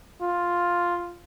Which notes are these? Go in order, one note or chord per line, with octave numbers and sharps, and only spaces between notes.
F4